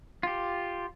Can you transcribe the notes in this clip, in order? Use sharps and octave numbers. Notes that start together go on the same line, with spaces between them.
F4 G4